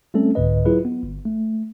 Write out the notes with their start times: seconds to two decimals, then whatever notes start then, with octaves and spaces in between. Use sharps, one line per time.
0.14 G3 A3 C4 C#4 A4
0.35 C2 G#2 D3 B4 D#5
0.65 F#3 E4 F4 G#4 B4
0.85 B3
1.03 G1
1.25 A3